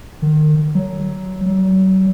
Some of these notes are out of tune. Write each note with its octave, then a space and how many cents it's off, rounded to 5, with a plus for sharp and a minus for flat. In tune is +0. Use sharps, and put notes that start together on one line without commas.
D#3 -35
F#3 +15
F#3 +40